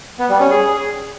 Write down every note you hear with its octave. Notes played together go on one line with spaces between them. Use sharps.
B3
G3
C#4
G#4